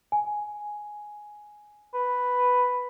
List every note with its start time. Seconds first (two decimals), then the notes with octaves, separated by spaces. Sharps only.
0.12 G#5
1.94 B4